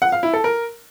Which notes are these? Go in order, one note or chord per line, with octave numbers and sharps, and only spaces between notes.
F#5
F5
E4
A4
A#4